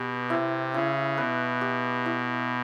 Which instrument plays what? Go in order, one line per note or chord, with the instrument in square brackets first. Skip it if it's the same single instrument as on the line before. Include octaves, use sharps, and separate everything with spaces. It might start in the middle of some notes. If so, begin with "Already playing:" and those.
Already playing: [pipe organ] B2 [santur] G4 B4
[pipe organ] C3 [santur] E4
[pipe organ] C#3 [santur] E4
[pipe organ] B2 [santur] B4
[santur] G4
E4